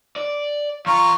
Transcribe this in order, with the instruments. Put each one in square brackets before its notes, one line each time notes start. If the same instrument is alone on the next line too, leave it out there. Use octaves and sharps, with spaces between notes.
[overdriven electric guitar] D5
[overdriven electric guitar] E2 A#5 [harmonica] F4 C#6